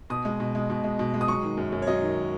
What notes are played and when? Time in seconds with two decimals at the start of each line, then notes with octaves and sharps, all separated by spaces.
0.10 B2 D#6
0.25 G#3
0.40 B2
0.55 G#3
0.70 B2
0.84 G#3
0.99 B2
1.14 G#3
1.21 D#6
1.28 F#3 C#6
1.43 D#3
1.57 F#2
1.72 F#2
1.82 C#5
1.87 F#3 D#5
2.02 D#3